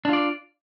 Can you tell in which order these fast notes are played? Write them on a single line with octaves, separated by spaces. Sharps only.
D4 F4 D5